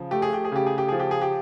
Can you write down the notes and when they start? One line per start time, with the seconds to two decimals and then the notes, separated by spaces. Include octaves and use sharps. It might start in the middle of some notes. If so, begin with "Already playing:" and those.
Already playing: C#3 F3
0.11 A3 G4
0.22 G#4
0.33 G4
0.45 G#4
0.52 C#3 G4
0.66 G#4
0.78 G4
0.89 F3 G#4
1.00 G4
1.11 G#4
1.22 G4